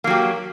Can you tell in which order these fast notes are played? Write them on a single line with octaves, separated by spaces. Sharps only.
A#3 F#3 G4